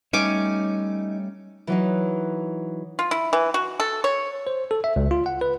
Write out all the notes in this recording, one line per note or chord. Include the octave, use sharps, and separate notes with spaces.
G3 A3 C#4 D#4 C#5 G#5 D6
E3 F#3 D#4
F4
E4
E3
F#4
A4
C#5
C5
A4
E5
C#2
F4
F#5
B4